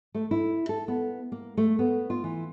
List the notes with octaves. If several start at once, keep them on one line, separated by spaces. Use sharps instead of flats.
A3
E4
A4
B3
A#3
A3
B3
F4
E3